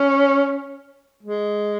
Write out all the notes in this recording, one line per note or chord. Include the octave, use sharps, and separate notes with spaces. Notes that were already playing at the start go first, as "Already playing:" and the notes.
Already playing: C#4
G#3